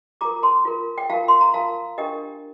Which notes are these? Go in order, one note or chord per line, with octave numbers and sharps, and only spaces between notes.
F4 A#4 A#5 D6
A5 C6
F4 A#4
G5
F4 A#4 F5 A5
C6
A#5
F4 A#4 F5 A5
D4 G4 A#4 D#5 G5